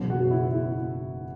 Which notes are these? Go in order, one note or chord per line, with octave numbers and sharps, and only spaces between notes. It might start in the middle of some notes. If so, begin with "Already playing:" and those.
Already playing: F#1 E2 B2 F#3
F#4
E4
E4